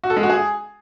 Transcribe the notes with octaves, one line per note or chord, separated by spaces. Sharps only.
F#4
A4
G#3
F#4
G#4